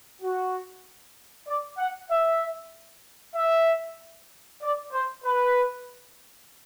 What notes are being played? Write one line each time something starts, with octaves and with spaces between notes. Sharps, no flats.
F#4
D5
F#5
E5
E5
D5
C5
B4